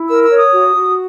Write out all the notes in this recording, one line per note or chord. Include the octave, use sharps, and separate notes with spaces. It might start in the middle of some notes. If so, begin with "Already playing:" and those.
Already playing: E4
A#4 E6
E6
C#5
D#6
F#4
F#4